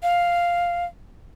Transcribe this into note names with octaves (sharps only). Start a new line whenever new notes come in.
F5